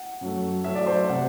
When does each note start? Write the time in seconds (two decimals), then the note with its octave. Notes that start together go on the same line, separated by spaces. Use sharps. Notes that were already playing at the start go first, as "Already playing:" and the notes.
Already playing: F#5
0.21 F#2 F#3 A3
0.64 F#2 F#3 A3 E5
0.75 D5
0.86 C5
0.98 E5
1.09 C3 F#3 F#5